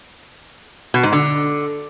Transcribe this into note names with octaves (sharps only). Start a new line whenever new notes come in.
B2
G#2
D3